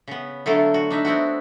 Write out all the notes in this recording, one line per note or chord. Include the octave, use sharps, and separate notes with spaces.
C#3 B3
D3 F#3 A3 E4 F4 A4
F#4
D4 D#4 E5
B3 C4 E4 F#4